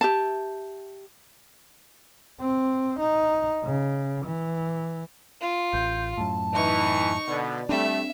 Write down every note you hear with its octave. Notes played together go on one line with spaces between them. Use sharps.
G4 E5 A5
C4
D#4
C#3
E3
F4
A1 G6
F#2 A2 A5
E3 D#4 C#6
B2 D3 D5
G3 A3 C4 D4 E5